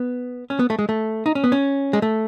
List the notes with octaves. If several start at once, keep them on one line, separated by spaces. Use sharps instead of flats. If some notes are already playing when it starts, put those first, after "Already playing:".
Already playing: B3
C#4
B3
A3
G#3
A3
D#4
C#4
B3
C#4
G#3
A3